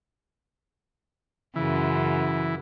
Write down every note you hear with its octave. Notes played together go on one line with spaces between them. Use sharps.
F#2 C#3 E3